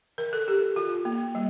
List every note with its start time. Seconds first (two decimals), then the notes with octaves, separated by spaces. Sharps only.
0.18 A#4
0.33 A4
0.48 G4
0.76 F4
1.05 A#3
1.35 G3